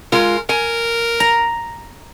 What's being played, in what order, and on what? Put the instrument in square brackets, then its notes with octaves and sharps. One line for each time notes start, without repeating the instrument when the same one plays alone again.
[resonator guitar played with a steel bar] G#3 F4 [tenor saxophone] A#4
[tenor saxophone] A#4 [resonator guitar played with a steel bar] G#5
[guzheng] A#5